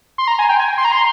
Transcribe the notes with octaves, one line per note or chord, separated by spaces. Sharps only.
C6
A#5
G#5
G5
G#5
C6
A#5
C6